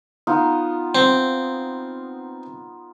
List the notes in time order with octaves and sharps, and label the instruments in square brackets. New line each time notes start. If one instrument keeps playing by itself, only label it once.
[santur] B3 D#4 F4
[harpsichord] C4